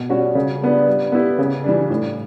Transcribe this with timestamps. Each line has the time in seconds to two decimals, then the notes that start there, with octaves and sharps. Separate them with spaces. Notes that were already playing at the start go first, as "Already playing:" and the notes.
Already playing: B2
0.09 G3 C#4 F#4
0.35 C#3
0.61 G3 B3 D4
0.87 G3
1.12 B3 E4 G4
1.39 C#3
1.64 E3 G3 D4
1.90 A2